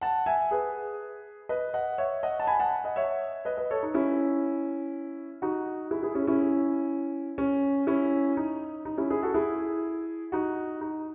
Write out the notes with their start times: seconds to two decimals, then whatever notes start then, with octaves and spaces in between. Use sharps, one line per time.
0.01 F#5 A5
0.26 E5 G#5
0.51 G#4 B4
1.49 B4 D#5
1.74 D#5 F#5
1.98 C#5 E5
2.23 D#5 F#5
2.40 A5
2.47 G#5 B5
2.60 F#5 A5
2.84 D#5 F#5
2.96 C#5 E5
3.45 B4 D#5
3.57 B4 D#5
3.71 A4 C#5
3.83 D#4
3.94 C#4 E4
5.42 D#4 F#4
5.91 E4 G#4
6.03 E4 G#4
6.15 C#4 E4
6.27 C#4 E4
7.38 C#4
7.87 C#4 E4
8.37 D#4
8.85 D#4
8.98 C#4 E4
9.10 E4 G#4
9.23 F#4 A4
9.34 E4 G#4
10.32 D#4 F#4
10.81 D#4